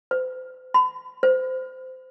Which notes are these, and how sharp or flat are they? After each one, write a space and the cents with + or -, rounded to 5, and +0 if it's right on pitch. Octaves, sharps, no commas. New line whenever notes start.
C5 -40
B5 +40
C5 -20